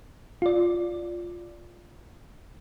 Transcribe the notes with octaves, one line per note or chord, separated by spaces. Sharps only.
F4 D5